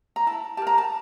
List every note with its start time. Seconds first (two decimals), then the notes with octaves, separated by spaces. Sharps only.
0.16 A#5
0.27 E4 A5
0.57 G4 A5
0.62 A#4 A#5
0.78 A5